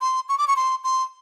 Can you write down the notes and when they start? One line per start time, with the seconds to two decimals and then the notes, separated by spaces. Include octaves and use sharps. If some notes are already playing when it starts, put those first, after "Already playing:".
0.01 C6
0.29 C#6
0.38 D6
0.48 C#6
0.56 C6
0.84 C6